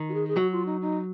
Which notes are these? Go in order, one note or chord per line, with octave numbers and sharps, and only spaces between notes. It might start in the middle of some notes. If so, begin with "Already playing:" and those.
Already playing: D#3
F#4
G#4
G#4
F#3 F#4
F4
D#4
D#4